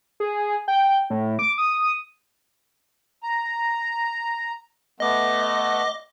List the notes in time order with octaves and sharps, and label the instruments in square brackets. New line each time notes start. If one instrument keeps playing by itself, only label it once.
[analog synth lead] G#4
G5
A2
D6
D#6
[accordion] A#5
[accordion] A3 B3 [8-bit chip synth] D#5 D6